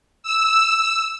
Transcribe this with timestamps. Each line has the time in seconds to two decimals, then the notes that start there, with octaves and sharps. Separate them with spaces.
0.23 E6